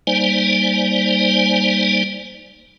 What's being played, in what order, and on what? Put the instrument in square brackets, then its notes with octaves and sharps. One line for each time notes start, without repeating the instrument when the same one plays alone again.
[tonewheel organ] G3 A#3 D#4 C5 D5 G#5